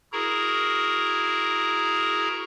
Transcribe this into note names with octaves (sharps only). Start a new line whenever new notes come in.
E4 F#4 G#4 A#4 A#5